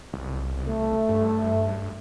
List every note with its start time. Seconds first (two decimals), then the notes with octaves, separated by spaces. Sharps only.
0.14 C2
0.67 A3
1.09 G2